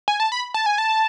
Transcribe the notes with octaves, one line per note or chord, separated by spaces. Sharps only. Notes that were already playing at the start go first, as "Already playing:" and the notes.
G#5
A5
B5
A5
G#5
A5